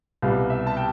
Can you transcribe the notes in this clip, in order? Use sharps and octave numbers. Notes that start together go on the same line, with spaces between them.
C2 B2 G3 F5
E5
A5
G5